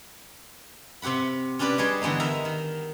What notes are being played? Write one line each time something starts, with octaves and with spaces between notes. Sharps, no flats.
C3 C4 G4 F#5 B5
C#4 D4 G4 B4 D5
G3 D4 G#4 C#5 D#5 C6
D3 E3 G#3 B3 D#4
A#4 D#5 E5 A#5
D#3